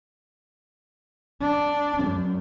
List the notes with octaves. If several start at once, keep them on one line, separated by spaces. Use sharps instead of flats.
D4
F#2